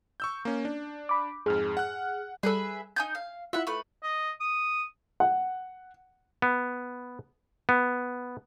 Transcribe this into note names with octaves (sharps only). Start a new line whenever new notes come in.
C#6 E6 G6
A#3 C#4
D4
B5 D6
F2 G#2 G#4 F6
F#5 F#6
G3 G#4 A4 B4 E5
D#4 G#5 D#6 G6 G#6
F5
E4 F4 E5 F#5
A3 B4
D#5
D#6
F#5
B3
B3